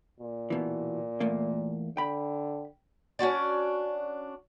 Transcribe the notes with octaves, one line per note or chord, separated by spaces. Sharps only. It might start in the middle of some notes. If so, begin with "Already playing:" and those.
A#2
B2 E3
E2 A3 A#3
D3 G5 B5
C#4 D4 F#4 D5